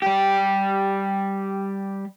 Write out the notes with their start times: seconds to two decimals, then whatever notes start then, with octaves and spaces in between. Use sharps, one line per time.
0.02 G3 G4